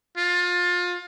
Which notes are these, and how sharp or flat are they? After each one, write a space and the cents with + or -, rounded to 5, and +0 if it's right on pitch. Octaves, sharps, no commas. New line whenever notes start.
F4 +25